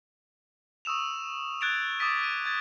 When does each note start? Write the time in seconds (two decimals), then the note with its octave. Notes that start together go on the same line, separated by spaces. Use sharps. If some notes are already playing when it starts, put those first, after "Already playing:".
0.85 C#6 D#6 E6 E7 F7
1.61 F#6 G#6 A6 D7 E7 F7
1.99 D6 D#6 A6 B6 D#7
2.23 D#7
2.45 G#6 A6